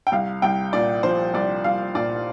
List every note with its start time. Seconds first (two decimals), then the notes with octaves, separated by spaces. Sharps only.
0.07 G5
0.12 C2 F5
0.42 C2 G5
0.73 A#2 D5
1.03 F3 C5
1.34 C2 D5
1.64 C2 F5
1.95 A#2 D5